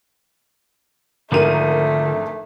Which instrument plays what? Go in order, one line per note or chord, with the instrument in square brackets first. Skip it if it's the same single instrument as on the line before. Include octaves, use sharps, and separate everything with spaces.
[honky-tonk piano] G#1 A#4 D#7 [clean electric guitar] D3 F3 C4 [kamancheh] A3